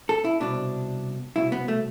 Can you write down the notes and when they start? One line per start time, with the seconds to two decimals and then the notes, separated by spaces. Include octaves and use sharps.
0.09 A4
0.25 E4
0.40 C2 B2 D4
1.36 C2 B2 E4
1.52 B3
1.68 A3